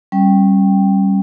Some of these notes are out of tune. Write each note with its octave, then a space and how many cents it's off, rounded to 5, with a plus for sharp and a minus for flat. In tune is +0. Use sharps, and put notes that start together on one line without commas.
G3 -5 C#4 -25 G5 +0